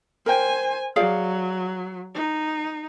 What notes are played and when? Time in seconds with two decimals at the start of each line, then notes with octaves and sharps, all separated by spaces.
0.26 A#4 C5 G5 G#5
0.96 F#3 G#4 D5 F5
2.15 D#4